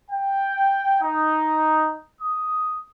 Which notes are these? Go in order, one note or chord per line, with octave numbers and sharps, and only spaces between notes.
G5
D#4
D#6